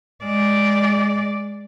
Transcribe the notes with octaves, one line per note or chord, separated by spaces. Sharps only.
G#3 D5